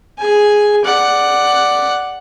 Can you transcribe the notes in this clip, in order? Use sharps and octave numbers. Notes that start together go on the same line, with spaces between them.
G#4 G#5
D5 F#5